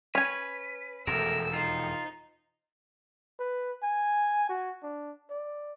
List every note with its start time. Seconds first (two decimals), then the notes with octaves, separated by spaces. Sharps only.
0.15 C#4 B4 G#5
1.07 E1 F2 C3 A3 A#4 E6
1.53 D#4 F4 C5
3.39 B4
3.83 G#5
4.49 F#4
4.83 D4
5.30 D5